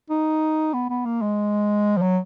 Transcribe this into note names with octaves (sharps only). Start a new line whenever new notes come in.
D#4
B3
B3
A#3
G#3
F3
F#3